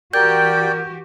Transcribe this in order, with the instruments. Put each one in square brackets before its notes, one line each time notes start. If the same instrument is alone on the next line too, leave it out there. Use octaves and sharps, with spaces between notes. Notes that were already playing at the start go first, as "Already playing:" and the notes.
[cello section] E3 F#4 G4 [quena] A#4 [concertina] D5 G5 [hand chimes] G6